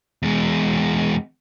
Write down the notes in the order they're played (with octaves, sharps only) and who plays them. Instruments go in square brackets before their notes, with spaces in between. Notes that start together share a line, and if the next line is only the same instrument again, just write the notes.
[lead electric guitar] E2 G#3